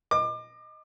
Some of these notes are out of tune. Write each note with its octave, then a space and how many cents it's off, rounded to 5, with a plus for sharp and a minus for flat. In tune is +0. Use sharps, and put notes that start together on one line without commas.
D#5 +0 D6 +30